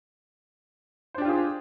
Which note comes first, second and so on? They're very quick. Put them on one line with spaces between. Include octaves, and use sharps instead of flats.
C5 D4 G4 F4 G#4